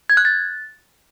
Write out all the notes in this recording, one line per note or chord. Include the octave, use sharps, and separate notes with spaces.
G#6
F#6
A6